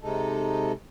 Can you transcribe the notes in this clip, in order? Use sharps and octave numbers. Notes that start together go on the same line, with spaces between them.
C3 G#3 D#4 A4